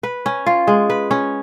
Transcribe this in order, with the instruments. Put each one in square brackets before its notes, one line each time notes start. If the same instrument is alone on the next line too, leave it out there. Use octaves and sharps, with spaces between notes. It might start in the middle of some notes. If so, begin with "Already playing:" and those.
[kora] B4
C#4
F4
G#3
B4
C#4